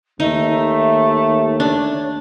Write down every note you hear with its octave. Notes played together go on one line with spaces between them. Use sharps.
D#2 A3 D#4 E5
D4 C#5